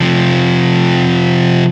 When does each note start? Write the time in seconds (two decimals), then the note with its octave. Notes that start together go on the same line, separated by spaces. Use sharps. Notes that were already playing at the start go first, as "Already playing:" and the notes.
0.01 C3 F3